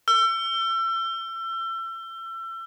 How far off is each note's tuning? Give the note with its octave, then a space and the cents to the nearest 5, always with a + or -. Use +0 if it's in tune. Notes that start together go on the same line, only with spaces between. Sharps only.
E6 +35